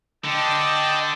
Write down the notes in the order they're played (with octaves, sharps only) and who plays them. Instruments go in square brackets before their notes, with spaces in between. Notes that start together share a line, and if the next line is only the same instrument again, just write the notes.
[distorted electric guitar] D3 [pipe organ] D#5 G5 A5